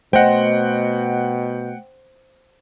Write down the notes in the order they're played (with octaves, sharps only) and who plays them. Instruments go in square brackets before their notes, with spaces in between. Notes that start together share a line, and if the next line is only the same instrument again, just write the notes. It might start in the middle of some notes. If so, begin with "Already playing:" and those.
[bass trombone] B2 [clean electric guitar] A3 D#5 [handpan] C5 [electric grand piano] F#5 G5